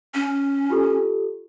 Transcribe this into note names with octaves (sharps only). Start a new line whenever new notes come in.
C#4
F4 G4 A4